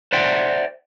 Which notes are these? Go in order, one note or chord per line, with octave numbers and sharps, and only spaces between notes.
C5 D5 E5 F#5 G5 C6